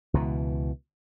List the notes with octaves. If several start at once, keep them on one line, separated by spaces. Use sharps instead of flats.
C#2 B2 E3